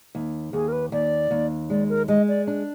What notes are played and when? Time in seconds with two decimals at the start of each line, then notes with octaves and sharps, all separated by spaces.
0.15 D#2
0.53 D#2 G#4
0.68 A#4
0.72 B4
0.92 D#2 D5
1.31 D#2
1.70 G#3 D5
1.89 A#4
2.08 G#3 D#5
2.28 D5
2.47 D4